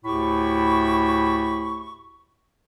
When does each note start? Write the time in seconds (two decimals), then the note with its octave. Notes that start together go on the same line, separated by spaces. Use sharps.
0.05 D2 A2 G4 B5 C#6